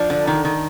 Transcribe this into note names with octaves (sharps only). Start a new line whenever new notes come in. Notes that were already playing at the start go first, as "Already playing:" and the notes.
Already playing: F3 D4
D3
D#3
D#3